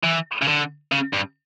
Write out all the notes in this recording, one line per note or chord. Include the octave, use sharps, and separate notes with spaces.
E3
C#3
D3
C#3
G2